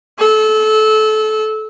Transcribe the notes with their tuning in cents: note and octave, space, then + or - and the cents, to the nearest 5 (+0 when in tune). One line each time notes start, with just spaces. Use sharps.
A4 -25